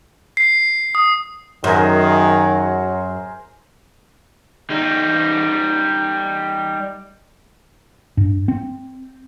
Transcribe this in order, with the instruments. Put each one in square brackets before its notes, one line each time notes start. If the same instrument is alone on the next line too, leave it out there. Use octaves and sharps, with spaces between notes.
[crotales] C7
D#6
[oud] F#2 [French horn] D#3 [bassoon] F#3 [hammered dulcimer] G#4 A#4 C5
[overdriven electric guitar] G3 D#4
[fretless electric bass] G2
C4